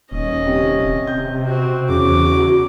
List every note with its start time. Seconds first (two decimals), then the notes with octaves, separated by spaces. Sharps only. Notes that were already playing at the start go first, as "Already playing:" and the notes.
0.11 D#1 C#4 D#5
0.46 C3
1.07 C3 G6
1.45 C4 F#4
1.89 E2 C#3 F#4 D6